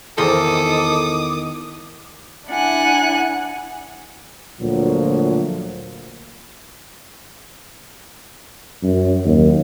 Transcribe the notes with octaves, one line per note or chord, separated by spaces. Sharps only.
E2 D#3 A4 A#4 C5 D6 D#6
D4 E4 F#5 G#5 F#6
D2 A#2 F3 F#3
F#2
D#2